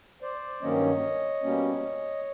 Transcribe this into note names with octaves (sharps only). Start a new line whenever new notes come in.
C5 D5
G2 D#3 F#3 A#3 C#4 C#5 D#5
B2 G3 A#3 C#4